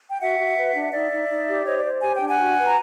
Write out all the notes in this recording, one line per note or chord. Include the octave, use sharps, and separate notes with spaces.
G5
F#4 E5 F#5
F#4
B4
D4
D#4 D5 E5
D#4
D#4
G4
C5 C#5 D#5
D5
C5
G4 G#5
G5
D4
F#5 G#5
F#4
B4
A#5